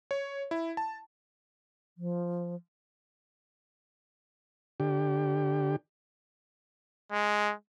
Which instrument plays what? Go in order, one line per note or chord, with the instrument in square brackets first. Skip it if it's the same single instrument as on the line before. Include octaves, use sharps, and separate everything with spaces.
[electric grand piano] C#5
E4
A5
[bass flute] F3
[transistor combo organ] D3 G4
[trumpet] G#3